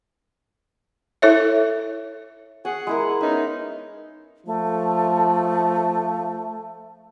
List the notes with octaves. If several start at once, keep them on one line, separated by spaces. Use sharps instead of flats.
E4 A4 C#5 E5
G#4 F#5 G#5
G#3 E4 A#4
B3 C#4 D#4 E5
F3 A3